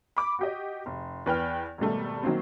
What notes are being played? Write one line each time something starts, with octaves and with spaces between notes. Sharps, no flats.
B5 D6
F#4 G4 D#5
F1
E2 B4 G5 F6
G#1 B2 G3 A3
D#3 F#3 A#3 C4